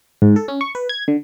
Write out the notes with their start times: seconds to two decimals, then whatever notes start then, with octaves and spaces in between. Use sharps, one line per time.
0.22 G#2
0.36 A4
0.48 C#4
0.61 C#6
0.75 B4
0.89 G#6
1.08 D3